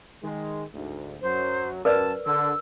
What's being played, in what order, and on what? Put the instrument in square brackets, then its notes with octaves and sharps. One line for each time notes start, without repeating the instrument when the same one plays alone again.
[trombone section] D#3 G#3
D2 G#2
[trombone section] F#2 F#3 [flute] C5
[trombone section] F#2 [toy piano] A#4 B4 D5 [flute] A5
[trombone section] D3 [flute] E6